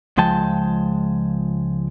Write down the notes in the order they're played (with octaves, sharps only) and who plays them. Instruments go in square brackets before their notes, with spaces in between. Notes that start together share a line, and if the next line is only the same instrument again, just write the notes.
[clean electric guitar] C#2 F3 G#3 G5 A5